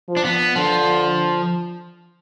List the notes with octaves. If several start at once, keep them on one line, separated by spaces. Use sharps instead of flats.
F3
D4
B3
D3 F3